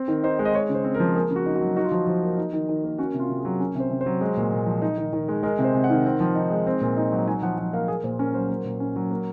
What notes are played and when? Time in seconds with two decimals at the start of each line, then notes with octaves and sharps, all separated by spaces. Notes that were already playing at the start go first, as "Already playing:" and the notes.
Already playing: C4
0.08 D#3
0.24 D#4 C5
0.39 G#3
0.45 D#5
0.54 G#3 C#5
0.69 C#3
0.74 C5
0.84 C4
0.94 A#4
1.00 F3
1.15 A#3 G#4
1.30 C#3
1.36 F#4
1.46 D#4
1.55 F#4
1.61 F#3
1.76 D#4 F#4
1.84 F4
1.92 F3 F#4
2.07 F3
2.23 A#3
2.37 D#4
2.53 D#3
2.69 D#3
2.84 A#3
2.98 C#4 F#4
3.14 C3
3.19 F4
3.30 C3
3.40 G#4
3.45 F#3
3.60 C#4 A#4
3.75 C3 C5
3.91 C3
4.01 C5
4.06 F#3
4.21 G#3
4.37 A#2
4.52 A#2
4.66 F3
4.82 D#4
4.98 D#3
5.13 D#3
5.28 G#3
5.43 G#3 A#4
5.59 C3
5.64 C5
5.75 C3
5.84 F#5
5.90 D#3
6.05 C4
6.20 F3
6.36 D#4
6.50 G#3
6.66 C4
6.81 A#2
6.97 D#4
7.12 F#3
7.27 D#4 G#5
7.42 F3 F#5
7.58 F3 F#5
7.73 A#3 F5
7.88 A#3 G#4
8.04 A#2 C5
8.19 C#4 A#4
8.34 F#3 C5
8.50 A#3
8.65 A#2
8.80 C#4
8.96 F#3
9.11 A#3